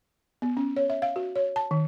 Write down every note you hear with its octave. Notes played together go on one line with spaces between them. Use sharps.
B3
C#4
C#5
E5
F5
F#4
C#5
A5
D#3